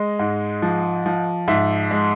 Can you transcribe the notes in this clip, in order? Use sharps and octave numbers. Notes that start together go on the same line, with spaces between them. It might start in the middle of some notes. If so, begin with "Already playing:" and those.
Already playing: G#3 D#5
G#2
F3
F3
G#2 E5
G#3